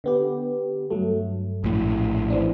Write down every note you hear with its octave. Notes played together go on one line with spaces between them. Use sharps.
D3 B3 G4
G2 F#3 A3
A#1 A2
E3 C4 D4